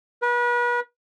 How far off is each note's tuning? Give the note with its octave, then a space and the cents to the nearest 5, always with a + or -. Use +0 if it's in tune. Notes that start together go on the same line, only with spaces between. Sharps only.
B4 -35